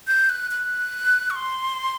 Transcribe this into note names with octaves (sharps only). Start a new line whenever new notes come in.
G6
F#6
F#6
C#6
C6